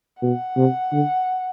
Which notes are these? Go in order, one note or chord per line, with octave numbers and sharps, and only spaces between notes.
B2 F#5
C3
D3